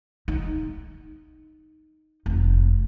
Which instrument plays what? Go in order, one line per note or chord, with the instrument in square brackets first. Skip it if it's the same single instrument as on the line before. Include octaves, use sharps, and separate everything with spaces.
[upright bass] D#4
F1